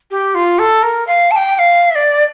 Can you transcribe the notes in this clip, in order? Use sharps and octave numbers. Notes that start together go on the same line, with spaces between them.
G4
F4
A4
A#4
F5
A5
G5
G5
F5
E5
D5